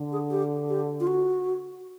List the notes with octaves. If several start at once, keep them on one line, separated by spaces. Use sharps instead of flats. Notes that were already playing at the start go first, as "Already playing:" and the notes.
Already playing: D3
G#4
G4
G4
F4
F#4